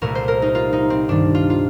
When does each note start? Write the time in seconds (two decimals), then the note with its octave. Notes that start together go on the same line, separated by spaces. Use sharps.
0.01 C2 A#2 A3 A#4
0.15 C5
0.28 A#4
0.42 D#4
0.55 F4
0.73 D#4
0.90 C4
1.08 G2 D#3 G3 D4
1.35 F4
1.50 F4